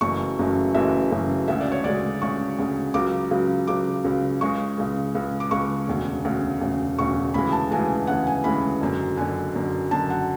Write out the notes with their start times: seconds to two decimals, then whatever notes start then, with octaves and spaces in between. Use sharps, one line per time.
0.01 F#1 F#2 C#3 E3 A3 C#6
0.38 F#1 F#2 C#3 E3 A3
0.74 F#1 F#2 C#3 E3 A3 E5
1.11 F#1 F#2 C#3 E3 A3
1.47 D2 C#3 G#3 E5
1.61 D5
1.72 C#5
1.84 D2 C#3 G#3 D5
2.22 D2 C#3 G#3 C#6
2.59 D2 C#3 G#3
2.94 C#2 C#3 F#3 D6
3.31 C#2 C#3 F#3
3.67 C#2 C#3 F#3 D6
4.04 C#2 C#3 F#3
4.41 C#2 C#3 G#3 C#6
4.78 C#2 C#3 G#3
5.15 C#2 C#3 G#3
5.40 D6
5.51 C#2 C#3 G#3 C#6
5.88 E1 D2 C#3
6.24 E1 D2 C#3
6.61 E1 D2 C#3
6.98 E1 D2 C#3 C#6
7.34 D2 C#3 E3 G#3 B5
7.52 A5
7.71 D2 C#3 E3 G#3 G#5
8.07 D2 C#3 E3 G#3 F#5
8.27 G#5
8.44 D2 C#3 E3 G#3 B5
8.81 F#1 F#2 D3
9.17 F#1 F#2 D3 G#5
9.55 F#1 F#2 D3
9.91 F#1 F#2 D3 A5
10.10 F#5